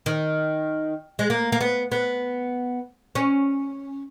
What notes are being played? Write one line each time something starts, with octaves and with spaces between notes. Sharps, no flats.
D#3
G#3
A#3
A#3
B3
B3
C#4